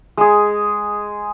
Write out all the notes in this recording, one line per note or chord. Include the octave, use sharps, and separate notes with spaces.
G#3 G#4